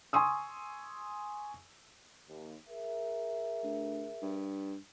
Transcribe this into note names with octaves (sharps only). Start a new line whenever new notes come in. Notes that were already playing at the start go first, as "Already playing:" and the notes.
G#5 C6 C#6 D#6 E6
D#2
G#4 A#4 E5
D2
G2